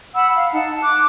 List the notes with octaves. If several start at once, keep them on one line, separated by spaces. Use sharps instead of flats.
F#5 B5 E6
F5
D#4 F#5 A5
D6 F#6